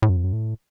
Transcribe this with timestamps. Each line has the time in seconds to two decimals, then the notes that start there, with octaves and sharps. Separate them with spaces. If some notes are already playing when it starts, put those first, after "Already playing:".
0.02 A2
0.09 F#2
0.16 F2
0.24 F#2
0.33 A2